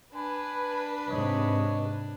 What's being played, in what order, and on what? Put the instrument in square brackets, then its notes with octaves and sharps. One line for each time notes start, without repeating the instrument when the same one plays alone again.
[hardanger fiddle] D4 [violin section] B4 [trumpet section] G#5 B5
[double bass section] G#2 C3 [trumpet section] C#5 D#5